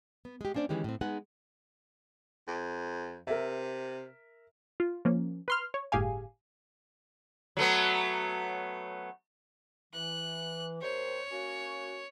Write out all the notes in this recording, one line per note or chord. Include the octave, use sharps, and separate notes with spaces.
B3
G#3 G4
A#3 C#4 D4 C5 D5
D#3 E3 G#3 C#4 G4
A2 C4
G#3 B3 D#4 G#4 F#5
F2
C3 A#4 E5
F4
F3 A#3 C#4
B4 C6 F6
C#5
G1 A2 G4 G#4 F5 G#5
F#3 A3 B3
E3 F#6
D#2 C5 C#5
A#3 C#4 F#4